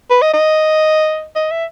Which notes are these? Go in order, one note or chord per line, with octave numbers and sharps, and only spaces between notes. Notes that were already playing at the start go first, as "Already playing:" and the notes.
B4
D#5
D#5
D#5
E5